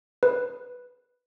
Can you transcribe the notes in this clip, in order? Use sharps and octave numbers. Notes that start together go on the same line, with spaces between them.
B4